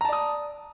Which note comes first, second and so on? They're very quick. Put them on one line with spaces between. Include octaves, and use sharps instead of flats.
A#5 A5 D5 D#6